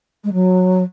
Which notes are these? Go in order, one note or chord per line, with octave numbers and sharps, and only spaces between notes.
G#3
F#3